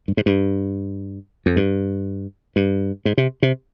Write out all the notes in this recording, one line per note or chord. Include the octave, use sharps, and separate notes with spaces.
G2
G#2
G2
F2
G2
G2
G#2
C3
C3